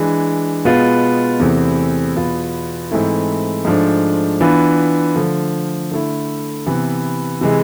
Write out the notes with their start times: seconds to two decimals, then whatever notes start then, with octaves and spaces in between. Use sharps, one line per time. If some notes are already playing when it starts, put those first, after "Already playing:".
Already playing: E3 G#3 D4
0.65 B2 G#3 B3 F4
1.40 E2 C3 E3 A3 C4
2.15 E2 B2 B3 F4
2.91 G#2 E3 A3 C4 E4
3.65 G#2 F3 A3 D4
4.40 E3 B3 D4 F4
5.16 D3 F3 A3
5.91 D3 A3 E4
6.66 C3 E3 B3
7.41 C3 E3 G#3